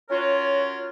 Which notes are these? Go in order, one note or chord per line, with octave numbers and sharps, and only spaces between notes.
C#4 F4 F#4 A#4 C#5